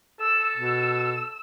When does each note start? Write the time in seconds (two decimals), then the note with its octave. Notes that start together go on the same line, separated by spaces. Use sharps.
0.20 A4 E6
0.57 B2 E6